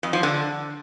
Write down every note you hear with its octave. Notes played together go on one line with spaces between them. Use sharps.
F2
F3
D3